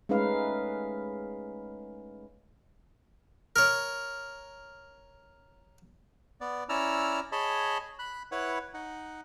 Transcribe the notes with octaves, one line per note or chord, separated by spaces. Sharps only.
G#3 A3 C#4 D#4 B4 F5
A#4 C#5
B3 D5
C#4 E4 D5 A#5 E6 F6
G#4 C#5 D#5 A5 B5
B5 F#6
E4 B4 C#5 F#5
D#4 F#5